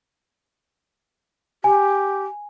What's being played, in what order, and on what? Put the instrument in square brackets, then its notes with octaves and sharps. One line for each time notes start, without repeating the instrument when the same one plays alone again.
[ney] G4 [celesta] G#5